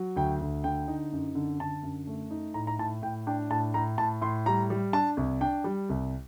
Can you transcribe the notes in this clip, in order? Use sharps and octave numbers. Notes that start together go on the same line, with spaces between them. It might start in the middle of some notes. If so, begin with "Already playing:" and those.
Already playing: F#3
D2 G5
D2
D3 G5
D#4
F#2
D3
D3 A5
F#2
A3
D#4
A2 A#5
A#5
A2 A5
A2 G5
D4 G5
A2 A5
A2 A#5
A2 A5
A2 C6
G3 A#5
G3
D4 A5
C2
D4 G5
G3
C2